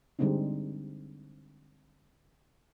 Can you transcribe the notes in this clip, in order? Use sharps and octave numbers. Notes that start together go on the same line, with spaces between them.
D3 G3 G#3 C4 D4 D#4